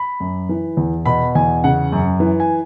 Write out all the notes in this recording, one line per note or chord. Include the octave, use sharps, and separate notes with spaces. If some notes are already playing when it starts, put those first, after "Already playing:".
Already playing: B5
F#2
E3
E2
B2 B5
E2 G#5
C#3 F#5
F#2
E3
G#5